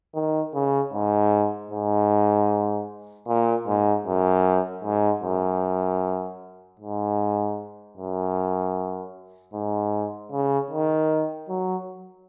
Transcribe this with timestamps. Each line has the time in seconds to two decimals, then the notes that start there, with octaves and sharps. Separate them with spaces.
0.15 D#3
0.54 C#3
0.93 G#2
1.71 G#2
3.28 A#2
3.67 G#2
4.06 F#2
4.84 G#2
5.23 F#2
6.80 G#2
7.97 F#2
9.53 G#2
10.32 C#3
10.71 D#3
11.49 F#3